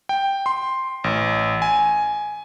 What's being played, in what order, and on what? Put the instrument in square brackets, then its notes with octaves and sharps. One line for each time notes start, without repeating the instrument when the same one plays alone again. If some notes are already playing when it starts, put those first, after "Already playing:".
[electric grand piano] G5
C6
A1
G#5